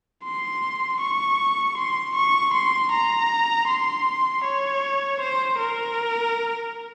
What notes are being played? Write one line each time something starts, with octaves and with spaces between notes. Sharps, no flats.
C6
C#6
C6
C#6
C6
A#5
C6
C#5
C5
A#4